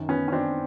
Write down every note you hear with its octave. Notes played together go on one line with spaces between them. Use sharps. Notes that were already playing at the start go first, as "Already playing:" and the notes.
Already playing: F#2 D#3
B3 C#4
C#4
C4 D4